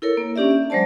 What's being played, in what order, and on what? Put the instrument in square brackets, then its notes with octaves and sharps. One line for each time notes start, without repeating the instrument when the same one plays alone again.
[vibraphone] E4 A4 A#4 C#5
A#3
C#4 D4 G4 D5 E5
E5
F#3 G#3 C5 D5 A5